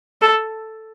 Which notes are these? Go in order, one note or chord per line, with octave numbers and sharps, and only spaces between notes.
A4